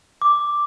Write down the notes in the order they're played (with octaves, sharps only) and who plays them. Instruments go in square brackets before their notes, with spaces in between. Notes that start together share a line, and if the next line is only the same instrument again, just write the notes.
[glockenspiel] D6